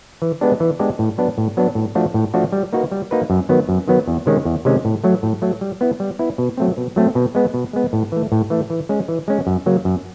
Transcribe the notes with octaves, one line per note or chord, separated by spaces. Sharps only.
E3
G#3 B3 D4 G4
E3
G#3 B3 D4 G4
A2
F#3 B3 D4
A2
F#3 B3 D4
A2
F3 A3 D4 F#4
A2
F3 A3 D4 F#4
G3
A#3 D#4 F#4 B4
G3
A#3 D#4 F#4 B4
F#2
D#3 F#3 B3
F#2
D#3 F#3 B3
E2
C3 D#3 G#3 C#4
E2
C3 D#3 G#3 C#4
A2
F#3 A3
A2
F#3 A3
G3
B3 E4
G3
B3 E4
B2
F#3 A3 C4
B2
F#3 A3 C4
B2
G#3 B3
B2
G#3 B3
A2
E3 A3
A2
E3 A3
E3
G#3 C#4
E3
G#3 C#4
F#2
C#3 F#3 A#3
F#2